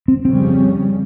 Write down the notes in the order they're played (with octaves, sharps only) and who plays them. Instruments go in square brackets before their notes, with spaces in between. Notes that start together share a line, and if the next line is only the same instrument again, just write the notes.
[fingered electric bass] C4
[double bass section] F2 C#3 G3 C#4 [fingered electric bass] C4